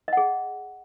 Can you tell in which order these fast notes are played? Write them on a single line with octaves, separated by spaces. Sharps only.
D#5 F#5 G#4